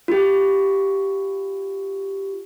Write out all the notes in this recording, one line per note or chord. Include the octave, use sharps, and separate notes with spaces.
F4 G4